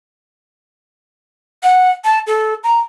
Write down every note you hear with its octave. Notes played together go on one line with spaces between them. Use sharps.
F#5
A5
A4
A#5